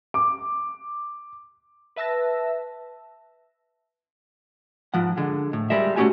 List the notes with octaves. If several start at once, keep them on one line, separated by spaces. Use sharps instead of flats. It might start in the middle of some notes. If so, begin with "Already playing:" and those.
D6
B4 E5 A5 E6 A#6
G#2 F3 F#5
D3 G#3
A2
G3 G#3 A#4 E5
A3 C#4 D#4 F#4 G4 G#5